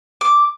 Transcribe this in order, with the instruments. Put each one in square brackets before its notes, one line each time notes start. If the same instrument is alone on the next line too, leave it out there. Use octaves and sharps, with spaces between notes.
[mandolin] D6